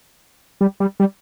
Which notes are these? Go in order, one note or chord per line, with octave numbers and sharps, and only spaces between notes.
G3
G3
G3